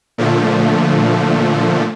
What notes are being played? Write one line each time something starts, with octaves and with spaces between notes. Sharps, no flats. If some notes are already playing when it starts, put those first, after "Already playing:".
A#2 D3 F3 A3